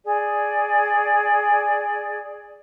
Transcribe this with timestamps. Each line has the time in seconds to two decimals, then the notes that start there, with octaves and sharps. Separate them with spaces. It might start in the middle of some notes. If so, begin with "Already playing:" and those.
0.05 G#4 D5